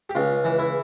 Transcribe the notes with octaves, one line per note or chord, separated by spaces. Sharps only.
G4
C#2 F4
E3
E4